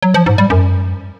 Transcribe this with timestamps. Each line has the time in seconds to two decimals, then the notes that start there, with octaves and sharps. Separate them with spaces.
0.02 F#3
0.14 F3
0.26 G#2
0.38 G3
0.50 F#2